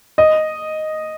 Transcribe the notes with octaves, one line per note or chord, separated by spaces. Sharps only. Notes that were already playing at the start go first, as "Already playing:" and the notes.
D#5